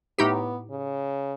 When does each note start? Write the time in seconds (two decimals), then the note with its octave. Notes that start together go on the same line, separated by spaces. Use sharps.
0.19 A2 B3 D#4 G4
0.71 C#3